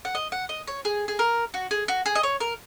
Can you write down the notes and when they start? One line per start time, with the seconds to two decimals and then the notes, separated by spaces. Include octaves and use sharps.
0.05 F#5
0.15 D#5
0.32 F#5
0.49 D#5
0.67 C#5
0.85 G#4
1.08 G#4
1.19 A#4
1.54 F#4
1.71 G#4
1.88 F#4
2.06 G#4
2.15 D#5
2.23 C#5
2.40 A#4